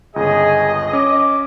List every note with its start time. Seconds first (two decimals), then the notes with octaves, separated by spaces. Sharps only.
0.16 G1 C#2 G#4 D#5
0.93 C#4 D6